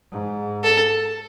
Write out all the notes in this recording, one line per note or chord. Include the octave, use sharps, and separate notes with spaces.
G#2
A4